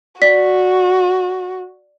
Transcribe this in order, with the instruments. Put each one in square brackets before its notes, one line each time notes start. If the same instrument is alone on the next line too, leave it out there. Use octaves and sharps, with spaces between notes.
[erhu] F#4 [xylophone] D5 B6